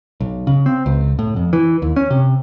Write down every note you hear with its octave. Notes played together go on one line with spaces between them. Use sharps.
B1
C#3
C4
C#2
A2
F2
E3
D#2
C#4
C3